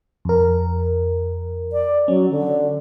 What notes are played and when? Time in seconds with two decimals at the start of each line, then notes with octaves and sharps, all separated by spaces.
0.25 F2 A#4
1.72 D5
2.08 F#3 C#4
2.31 D3